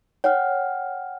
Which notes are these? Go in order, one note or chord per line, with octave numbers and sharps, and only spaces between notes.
C#5 F#5 G5 F6